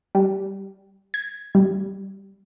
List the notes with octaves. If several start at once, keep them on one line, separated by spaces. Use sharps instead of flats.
G3
G#6
G3